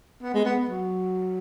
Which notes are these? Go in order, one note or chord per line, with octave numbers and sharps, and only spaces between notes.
B3
G#3
B3
F#3